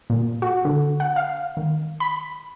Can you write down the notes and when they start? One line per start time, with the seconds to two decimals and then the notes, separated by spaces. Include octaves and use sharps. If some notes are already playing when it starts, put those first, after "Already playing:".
0.10 A#2
0.42 F#4
0.65 D3
1.00 F#5
1.16 F5
1.57 D#3
2.00 B5